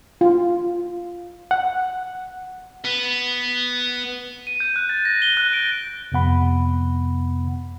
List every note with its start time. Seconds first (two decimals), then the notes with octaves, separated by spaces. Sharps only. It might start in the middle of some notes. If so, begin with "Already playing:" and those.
0.21 F4
1.51 F#5
2.85 B3
4.47 D#7
4.60 G6
4.76 F#6
4.89 A6
5.05 A#6
5.22 G7
5.37 F#6
5.53 D7
6.12 F2 C3 B3 F#5 B5